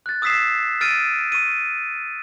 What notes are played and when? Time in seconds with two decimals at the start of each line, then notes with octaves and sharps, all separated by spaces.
0.06 F#6 A6
0.22 D#6 E6 G#6 B6 C7 E7
0.81 E6 F6 A6 D7 D#7
1.32 C#6 D#7